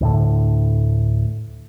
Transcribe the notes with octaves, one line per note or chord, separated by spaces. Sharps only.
D2 A2 D3